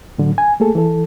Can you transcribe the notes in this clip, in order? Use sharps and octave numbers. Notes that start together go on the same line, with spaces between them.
A2 D3 F#3
G#5
A3 A#3 G#4 A4
E3 A4